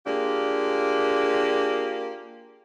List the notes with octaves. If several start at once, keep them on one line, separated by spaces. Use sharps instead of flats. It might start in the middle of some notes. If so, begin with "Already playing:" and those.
A#3 D4 F4 G4 G#4